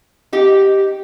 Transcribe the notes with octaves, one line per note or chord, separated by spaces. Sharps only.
D#4 G4